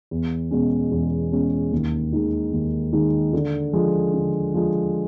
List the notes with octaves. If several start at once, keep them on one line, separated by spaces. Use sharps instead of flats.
E2
B2 G#3 C#4
E2
B2 G#3 C#4
D#2
D#3 G#3
D#2
D#3 G#3
D3
F3 G#3
D3
F3 G#3